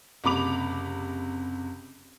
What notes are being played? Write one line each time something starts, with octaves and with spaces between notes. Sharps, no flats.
F#1 C3 B5 D6 F7